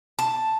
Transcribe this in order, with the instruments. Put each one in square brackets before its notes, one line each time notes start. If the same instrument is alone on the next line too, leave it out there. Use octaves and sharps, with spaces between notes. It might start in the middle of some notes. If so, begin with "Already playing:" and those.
[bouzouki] A5